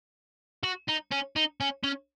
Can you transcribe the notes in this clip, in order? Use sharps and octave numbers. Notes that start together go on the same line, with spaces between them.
F#4
D#4
C#4
D#4
C#4
C#4